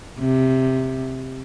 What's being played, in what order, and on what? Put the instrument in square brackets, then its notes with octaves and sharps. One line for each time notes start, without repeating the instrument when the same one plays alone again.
[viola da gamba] C3